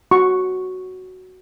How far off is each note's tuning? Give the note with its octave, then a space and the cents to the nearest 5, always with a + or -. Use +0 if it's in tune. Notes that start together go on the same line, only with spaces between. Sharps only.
F#4 +0 C#6 +0